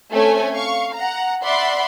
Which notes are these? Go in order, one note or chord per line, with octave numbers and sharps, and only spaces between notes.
A3 C4 C#4 C#5 G#5
F5 C#6
F#5 A#5
D5 E5 F#5 B5 C6